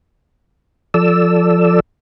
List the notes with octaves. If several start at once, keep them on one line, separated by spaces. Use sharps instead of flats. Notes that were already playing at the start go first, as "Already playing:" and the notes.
F3 A4 D5 E6